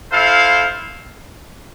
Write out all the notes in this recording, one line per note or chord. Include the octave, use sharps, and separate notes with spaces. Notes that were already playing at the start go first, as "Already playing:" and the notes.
E4 A4 C5 F5